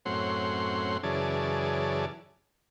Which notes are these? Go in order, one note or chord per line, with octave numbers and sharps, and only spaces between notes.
F#2 A2 C4 C#4 F#5 C6
F#2 C#3 E3 G#4 D5 A5